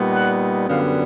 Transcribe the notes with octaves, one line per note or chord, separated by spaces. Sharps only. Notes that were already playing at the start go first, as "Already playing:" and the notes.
Already playing: A#2 G3 B3 D#4
F#5
F#2 D3 G3 B3 F5